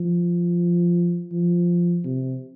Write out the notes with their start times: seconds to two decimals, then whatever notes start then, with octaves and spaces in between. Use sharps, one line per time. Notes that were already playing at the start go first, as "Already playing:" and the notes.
Already playing: F3
1.32 F3
2.04 C3